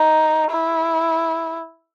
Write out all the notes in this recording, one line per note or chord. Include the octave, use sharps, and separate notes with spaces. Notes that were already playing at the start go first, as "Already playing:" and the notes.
Already playing: D#4
E4